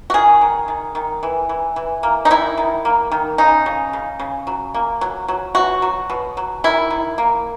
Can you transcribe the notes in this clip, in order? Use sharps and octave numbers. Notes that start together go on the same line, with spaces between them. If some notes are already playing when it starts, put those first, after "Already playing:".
F#4
D#3 G#4
D#3
D#3
D#3
E3
E3
E3
A#3
D#4
D#3 E4
D#3
A#3
D#3
C#3 D#4
C#3
C#3
C#3
F#3
A#3
F#3
F#3
B2 F#4
F#3
B2
F#3
D#3 E4
D#3
A#3